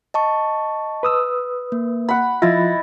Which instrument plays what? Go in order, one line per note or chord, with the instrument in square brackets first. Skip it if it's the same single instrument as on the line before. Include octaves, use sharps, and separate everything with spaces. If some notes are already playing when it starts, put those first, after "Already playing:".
[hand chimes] D#5 A5 C#6
[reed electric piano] B4 D#6 E6
[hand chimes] A#3
[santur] F#5 B5
[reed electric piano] F3 F4 [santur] E4 [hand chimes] D#5 A6 A#6